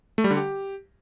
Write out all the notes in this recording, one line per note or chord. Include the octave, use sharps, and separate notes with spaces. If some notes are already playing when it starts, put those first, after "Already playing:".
A3
G3
D3
G4